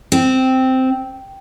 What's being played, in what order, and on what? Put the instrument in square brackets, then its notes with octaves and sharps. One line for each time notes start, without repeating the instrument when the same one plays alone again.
[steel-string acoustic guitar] C4